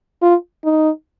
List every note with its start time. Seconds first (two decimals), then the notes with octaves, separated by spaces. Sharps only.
0.22 F4
0.64 D#4